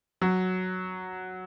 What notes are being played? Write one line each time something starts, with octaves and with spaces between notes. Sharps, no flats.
F#3